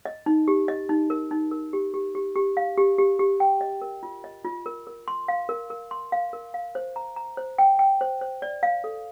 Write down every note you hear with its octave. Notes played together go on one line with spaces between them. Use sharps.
D#5
D#4
G4
D#5
D#4
A#4
D#4
A#4
G4
G4
G4
G4
F5
G4
G4
G4
G5
D#5
A#4
F4
D#5
F4
A#4
A#4
C6
F5
A#4
A#4
C6
F5
A#4
F5
C5
A#5
A#5
C5
G5
G5
C5
C5
D5
F5
A4